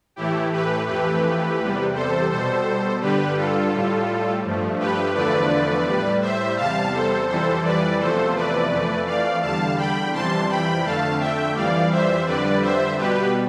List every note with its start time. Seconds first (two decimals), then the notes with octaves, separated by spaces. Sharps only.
0.16 A2 E3 A3 E4 G4
0.52 G4 B4
0.87 F2 E3 A3 G4 B4
1.59 E2 C3 G3
1.94 A4 C5
2.30 B2 G3 A4 C5
3.01 G2 D3 G3 G4 B4
3.37 F4 A4
3.72 A2 G3
4.44 G2 F3 A3
4.79 G4 B4
5.14 E2 D3 F3 A3 B4 D5
5.86 A2 G3
6.21 C5 E5
6.57 E2 C3 G3 F5 A5
6.92 A4 C5
7.28 F2 E3 G3 A4 C5
7.64 B4 D5
7.99 E2 C3 F3 A3 A4 C5
8.35 B4 D5
8.70 F2 E3 A3
9.06 D5 F5
9.41 E2 D3 G3 F5 A5
9.77 G5 B5
10.12 F2 C3 E3 G3 A5 C6
10.49 G5 B5
10.84 F2 D3 A3 F5 A5
11.19 E5 G5
11.55 F2 E3 G3 D5 F5
11.91 C5 E5
12.26 F2 D3 G3 B4 D5
12.61 C5 E5
12.97 B2 G3 G4 B4